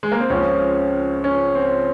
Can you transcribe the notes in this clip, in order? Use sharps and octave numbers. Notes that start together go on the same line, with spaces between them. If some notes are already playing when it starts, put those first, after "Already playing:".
G#3
A#3
C4
C#2 C#3 F3 C#4
C#4
C4